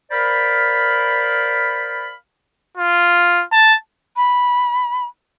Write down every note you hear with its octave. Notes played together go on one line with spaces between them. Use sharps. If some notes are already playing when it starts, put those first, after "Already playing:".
A#4 C5 D5 F5 B5
F4
A5
B5